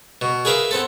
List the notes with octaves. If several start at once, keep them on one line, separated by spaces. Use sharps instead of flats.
B2
G#4 A#4 B4 E5 F5
B3 C4 A4